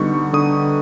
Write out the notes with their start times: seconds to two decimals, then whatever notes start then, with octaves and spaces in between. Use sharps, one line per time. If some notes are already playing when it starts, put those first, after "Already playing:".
Already playing: D3 G3 B3 D#4 C#6
0.33 D3 D#6